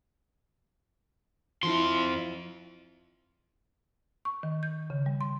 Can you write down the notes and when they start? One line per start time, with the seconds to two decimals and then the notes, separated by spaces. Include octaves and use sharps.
1.63 F2 F3 E4 C6
4.25 C#6
4.43 D#3
4.63 G6
4.90 C#3
5.06 G3
5.21 C6